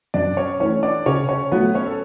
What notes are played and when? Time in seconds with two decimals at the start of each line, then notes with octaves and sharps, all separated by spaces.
0.14 F#2 D4 D5
0.37 C#4 C#5
0.60 E3 A3 C#4 E4 C#5
0.83 D4 D5
1.06 C#3 C#4 C#5
1.29 C#4 C#5
1.52 F#3 A3 B3 B4
1.74 C#4 C#5
1.86 A4